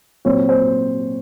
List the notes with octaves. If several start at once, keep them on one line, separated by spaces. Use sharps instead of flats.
A#2 F#3 C4 C#5
C5